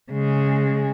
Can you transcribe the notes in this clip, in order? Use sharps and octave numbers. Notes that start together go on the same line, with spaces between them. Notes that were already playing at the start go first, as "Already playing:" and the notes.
C#3 G#3